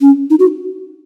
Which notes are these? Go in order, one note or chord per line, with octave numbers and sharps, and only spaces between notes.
C#4
D#4
F#4